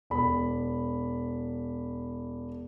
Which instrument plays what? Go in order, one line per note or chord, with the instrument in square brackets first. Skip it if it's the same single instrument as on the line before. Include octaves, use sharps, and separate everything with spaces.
[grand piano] E1 B5